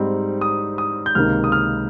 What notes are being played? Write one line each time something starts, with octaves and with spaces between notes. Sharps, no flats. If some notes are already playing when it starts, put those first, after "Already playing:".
Already playing: G#2 G3 C4 D#4
D#6
D#6
G6
C#2 C3 D#3 A#3 D#4 F6
D#6
F6